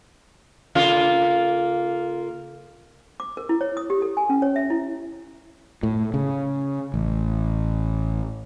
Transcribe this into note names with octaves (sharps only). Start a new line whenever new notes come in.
C#3 A#3 F4
D6
A#4
E4
C#5
D#6
G4
A4
G#5
C#4
C#5
E5
E4
A2
C#3
A1